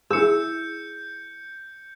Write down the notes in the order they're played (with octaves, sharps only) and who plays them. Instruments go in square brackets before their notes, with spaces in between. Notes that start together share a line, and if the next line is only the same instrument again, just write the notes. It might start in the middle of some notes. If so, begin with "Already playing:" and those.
[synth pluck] E4 G#4 [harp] E6 [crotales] G6 C#7